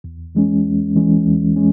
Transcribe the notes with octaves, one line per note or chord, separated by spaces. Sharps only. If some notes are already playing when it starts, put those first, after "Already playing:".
E2
E3 G#3 C#4
E2
E3 G#3 C#4
E2
G#3 C#4